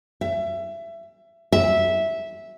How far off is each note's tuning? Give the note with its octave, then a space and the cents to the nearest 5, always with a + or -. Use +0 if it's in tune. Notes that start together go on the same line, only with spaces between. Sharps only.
E5 +25
E5 -10